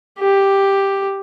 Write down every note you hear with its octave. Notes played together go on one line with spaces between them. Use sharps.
G4